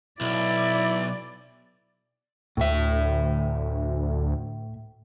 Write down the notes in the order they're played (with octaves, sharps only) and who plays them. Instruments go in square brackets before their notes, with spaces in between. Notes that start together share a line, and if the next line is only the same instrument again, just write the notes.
[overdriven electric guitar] B1 [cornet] E4 [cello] D5
[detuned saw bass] D2 [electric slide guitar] A2 E5